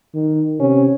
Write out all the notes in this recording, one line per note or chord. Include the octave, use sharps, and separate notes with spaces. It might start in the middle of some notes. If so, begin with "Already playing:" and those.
D#3
C3 C#4